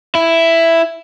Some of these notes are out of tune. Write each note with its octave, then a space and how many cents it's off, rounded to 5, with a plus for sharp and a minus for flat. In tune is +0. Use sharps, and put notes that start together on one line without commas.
E4 +5